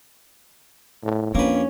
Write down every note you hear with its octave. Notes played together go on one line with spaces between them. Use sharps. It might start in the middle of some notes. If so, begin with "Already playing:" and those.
A2
F2 A#3 C#4 D4 B4